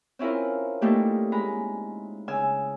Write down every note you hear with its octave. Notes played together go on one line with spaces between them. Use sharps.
C4 C#4 E4 F4 A#4
G3 A3 A#3 D#4 A4
G#3 A#5 B5
C#3 G#5 E6